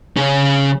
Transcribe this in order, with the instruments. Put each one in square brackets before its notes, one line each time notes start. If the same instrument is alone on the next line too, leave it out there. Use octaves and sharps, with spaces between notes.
[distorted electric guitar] C#3 C#4